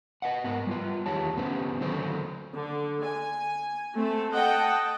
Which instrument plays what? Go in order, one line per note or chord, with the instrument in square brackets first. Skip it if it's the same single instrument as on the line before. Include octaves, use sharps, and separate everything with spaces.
[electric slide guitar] B4 D#5 F#5
G#2 B3 A#4 F#5
G3 F4 B4
E2 D#3 G4 C#5 A5
D3 B3 C#4 G4 B4 C5
D3 D#3 F#3 A4 C5
[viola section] D3
G#5
A3 C4 A4
D#5 F#5 G5 A5